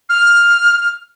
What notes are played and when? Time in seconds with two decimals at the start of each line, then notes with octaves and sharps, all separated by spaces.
0.09 F6